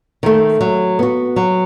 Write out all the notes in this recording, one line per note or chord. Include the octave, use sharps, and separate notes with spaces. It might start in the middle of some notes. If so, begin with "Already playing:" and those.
D#3 A3
F#3
B3 F#4
F#3